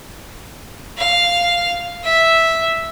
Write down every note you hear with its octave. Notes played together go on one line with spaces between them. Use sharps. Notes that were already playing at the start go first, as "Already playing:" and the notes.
F5
E5